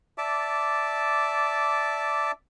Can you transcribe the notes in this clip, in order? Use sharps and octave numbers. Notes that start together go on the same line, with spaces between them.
D5 E5 A5 D6